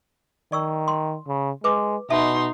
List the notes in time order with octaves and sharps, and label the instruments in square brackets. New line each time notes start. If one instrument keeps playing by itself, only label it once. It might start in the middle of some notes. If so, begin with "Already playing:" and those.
[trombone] D#3 [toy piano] D5 C#6 E6
[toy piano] C6
[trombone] C#3
[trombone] G#3 [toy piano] B4 D6
[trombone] B2 [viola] D#4 C6 [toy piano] E5 A5